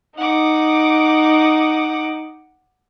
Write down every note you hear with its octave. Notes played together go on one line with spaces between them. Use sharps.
D#4 F#5 D6